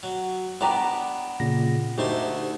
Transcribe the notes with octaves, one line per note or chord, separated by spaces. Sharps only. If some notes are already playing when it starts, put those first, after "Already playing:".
F#3
B3 D4 G4 A#5 B5
A#2 C#3 A#6
D2 A3 D#4 G4 C5 C6